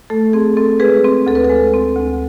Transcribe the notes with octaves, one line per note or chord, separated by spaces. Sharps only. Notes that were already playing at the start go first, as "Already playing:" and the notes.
A3 A4
C4 G#4
C4 A4
G#3 G#4 B4
C4
D2 A4
B4
A4
G#3
C4
D2